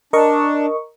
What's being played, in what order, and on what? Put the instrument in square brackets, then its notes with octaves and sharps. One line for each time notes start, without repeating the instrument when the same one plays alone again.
[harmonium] D4 [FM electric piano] A#4 D#5 C#6